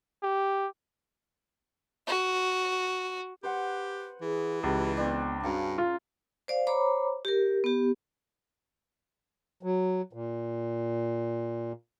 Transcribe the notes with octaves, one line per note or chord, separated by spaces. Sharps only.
G4
F#4
G4 B4 C5 F#5
E3 G#4
C#2 G4
B3 C4 D4
G2 C#3 F#4 A#5
F4
C5 D5 F5
C5 C#5 A#5 B5 D6
G4 A#4
B3 G4
F#3
A#2